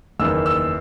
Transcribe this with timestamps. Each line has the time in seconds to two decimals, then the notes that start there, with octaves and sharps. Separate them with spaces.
0.20 F#1 E2 D#3 A#3 E6
0.46 E6